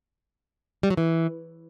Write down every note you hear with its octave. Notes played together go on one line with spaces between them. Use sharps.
G3
F#3
E3